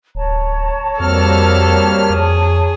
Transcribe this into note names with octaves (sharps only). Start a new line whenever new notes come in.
D1 C#5 A5 A#5
F2 G3 A#3 C4 F#4 A4 F6
F2 G#4